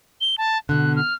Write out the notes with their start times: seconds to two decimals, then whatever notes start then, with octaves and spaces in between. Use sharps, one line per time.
0.21 G7
0.38 A5
0.69 B2 D3 F#6
0.96 F6